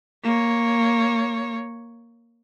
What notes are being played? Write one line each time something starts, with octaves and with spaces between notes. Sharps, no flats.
A#3 C#5